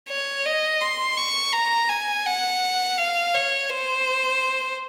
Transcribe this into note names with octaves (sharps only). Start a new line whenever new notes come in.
C#5
D#5
C6
C#6
A#5
G#5
F#5
F5
C#5
C5